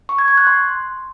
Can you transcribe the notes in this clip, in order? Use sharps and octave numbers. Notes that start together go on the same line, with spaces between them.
C#6
G#6
C#6
F#6
C6